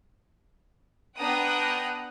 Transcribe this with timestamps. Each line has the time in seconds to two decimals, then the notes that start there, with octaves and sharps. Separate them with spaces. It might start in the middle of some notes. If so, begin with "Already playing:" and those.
1.16 B3 D4 F#5 G5 A#5 D#6